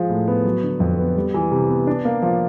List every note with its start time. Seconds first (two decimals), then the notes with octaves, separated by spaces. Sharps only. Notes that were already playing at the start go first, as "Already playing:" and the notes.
Already playing: F3 G#3
0.09 A2
0.28 B3
0.45 F#3
0.63 D3
0.80 F2
0.99 B3
1.16 G3
1.34 E3
1.51 C3
1.69 B3
1.87 D4
2.05 A#3
2.22 F3